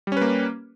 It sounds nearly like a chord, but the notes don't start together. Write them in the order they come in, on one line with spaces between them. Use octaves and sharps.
G3 C#4 B4 A#3